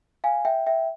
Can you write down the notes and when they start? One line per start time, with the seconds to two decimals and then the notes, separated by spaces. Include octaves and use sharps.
0.24 F5 G#5
0.45 E5 G5
0.67 E5 G5